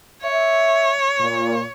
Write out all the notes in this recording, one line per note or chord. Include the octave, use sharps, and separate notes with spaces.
C#5 E5
A#2